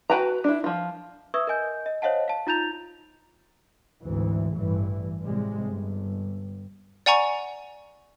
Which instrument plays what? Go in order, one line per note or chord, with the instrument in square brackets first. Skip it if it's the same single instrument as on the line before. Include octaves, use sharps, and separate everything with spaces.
[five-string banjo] F#4 B4 G5 A5 A#5
D4 E4
F3 F4
[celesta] B4 E5 C#6 D#6 E6 G#6
A#4 D#5 G#5 G6
D#5
C5 C#5 D#5 F5 F#5 A5
F5 A5
D#4 F4 A#5 G6 A6 F7
[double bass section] G#1 D2 E3
A1 G2 E3
A2 C3 G3 G#3
G1
[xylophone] D5 F#5 G#5 A#5 C#6